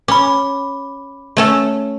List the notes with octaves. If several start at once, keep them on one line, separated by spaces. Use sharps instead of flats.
C#4 B5 D6
A3 C#4 A4